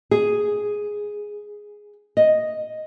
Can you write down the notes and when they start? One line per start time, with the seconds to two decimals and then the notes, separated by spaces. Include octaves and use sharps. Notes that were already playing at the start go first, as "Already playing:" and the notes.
0.11 G#4
2.17 D#5